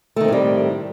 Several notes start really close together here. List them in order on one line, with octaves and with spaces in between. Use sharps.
A3 D#3 C4 A2 G3